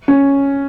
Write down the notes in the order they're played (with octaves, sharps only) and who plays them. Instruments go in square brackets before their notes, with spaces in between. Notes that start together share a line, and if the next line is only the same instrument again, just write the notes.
[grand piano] C#4